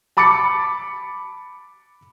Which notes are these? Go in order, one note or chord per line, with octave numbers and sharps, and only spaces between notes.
A5 B5 D6 A6 C#7